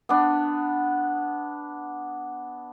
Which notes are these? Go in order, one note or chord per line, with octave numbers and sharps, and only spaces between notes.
B3 D4